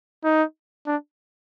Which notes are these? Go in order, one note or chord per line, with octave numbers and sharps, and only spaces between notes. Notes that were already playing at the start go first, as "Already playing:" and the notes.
D#4
D4